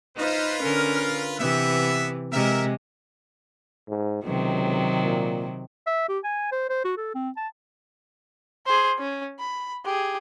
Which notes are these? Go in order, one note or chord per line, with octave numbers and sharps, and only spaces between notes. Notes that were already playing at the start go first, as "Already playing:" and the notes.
D#4 F4 B4 C5
D3 C#4 A#4
C3 E3 B3 E5
C3 G#3 A#4 E5
G#2
C#2 C3 D#3 F#3
A#2
E5
G4
G#5
C5
C5
F#4
A4
C4
A5
G#4 C5
C#4
B5
G4 G#4